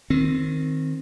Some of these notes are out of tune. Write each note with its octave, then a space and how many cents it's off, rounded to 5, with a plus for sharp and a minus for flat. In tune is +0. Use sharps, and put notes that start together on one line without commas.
D#3 +0 C4 +0